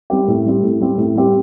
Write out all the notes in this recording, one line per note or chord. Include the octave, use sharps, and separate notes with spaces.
G3 C4 G4
A2
G3 C4 G4
A2
G3 C4 G4
A2
G3 C4 G4